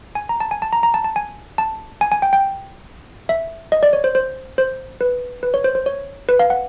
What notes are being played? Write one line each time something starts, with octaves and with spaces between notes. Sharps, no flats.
G#5
A#5
A5
G#5
A5
A#5
A#5
A5
A5
G#5
A5
G#5
G#5
G5
G5
E5
D#5
D5
C#5
C5
C5
C5
B4
B4
C#5
C5
C5
C#5
B4
F5
F#5